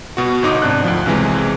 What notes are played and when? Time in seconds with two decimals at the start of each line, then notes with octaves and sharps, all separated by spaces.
0.17 B2 F#4
0.43 G1 D#4 D6 D#6
0.62 G#1 C3 D4 F#6
0.84 D2 F3
1.06 B1 C3 E3 G#3